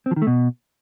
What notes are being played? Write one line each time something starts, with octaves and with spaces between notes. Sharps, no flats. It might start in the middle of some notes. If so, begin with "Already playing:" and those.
C4
F3
D#3
A3
B2